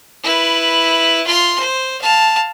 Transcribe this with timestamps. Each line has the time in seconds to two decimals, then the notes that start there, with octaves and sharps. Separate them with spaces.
0.23 E4 B4
1.26 F4 C6
1.59 C5
2.01 F5 A5